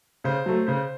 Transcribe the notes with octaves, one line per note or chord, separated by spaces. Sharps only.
C#3 C5
F#3 A3
C#3 C5